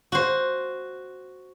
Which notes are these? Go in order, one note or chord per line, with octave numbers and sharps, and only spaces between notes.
F#4 C5